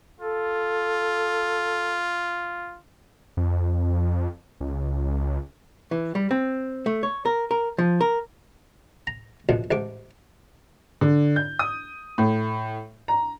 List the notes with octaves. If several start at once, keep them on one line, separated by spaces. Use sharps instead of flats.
F4 A4
F2
C#2
E3
G3
C4
A3
C#5
A#4
A#4
F3
A#4
A#5
A#1 F#2 B2
A1 G#2 D6
D3
G6
D#6
A2
A#5